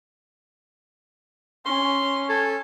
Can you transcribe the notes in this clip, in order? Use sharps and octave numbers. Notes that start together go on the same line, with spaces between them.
C#4 C6
A4 G#5